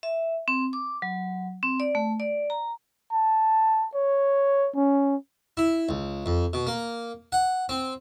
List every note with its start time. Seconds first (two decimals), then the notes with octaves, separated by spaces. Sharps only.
0.03 E5
0.48 C4
0.73 D6
1.02 F#3
1.63 C4
1.80 D5
1.95 A3
2.20 D5
2.50 A#5
3.13 A5
3.94 C#5
4.75 C#4
5.57 E4
5.89 C#2
6.26 F2
6.53 B2
6.67 A#3
7.32 F#5
7.69 C4